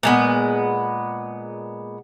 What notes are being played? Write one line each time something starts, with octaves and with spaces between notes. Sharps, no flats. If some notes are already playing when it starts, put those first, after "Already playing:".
A#2 G#3 B3